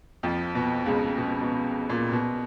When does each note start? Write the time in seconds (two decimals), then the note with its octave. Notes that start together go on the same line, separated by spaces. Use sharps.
0.23 F2 F3
0.55 B2
0.86 C#2 C#3
1.17 B2
1.42 B2
1.89 A#2
2.12 B2